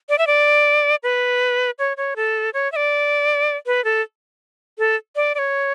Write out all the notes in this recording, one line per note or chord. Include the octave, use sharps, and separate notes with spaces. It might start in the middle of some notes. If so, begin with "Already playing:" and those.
D5
E5
D5
B4
C#5
C#5
A4
C#5
E5
D5
B4
A4
A4
D5
D5
C#5